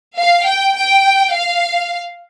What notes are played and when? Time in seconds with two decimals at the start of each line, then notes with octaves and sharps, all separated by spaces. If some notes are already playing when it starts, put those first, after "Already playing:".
0.18 F5
0.47 G5
0.76 G5
1.34 F5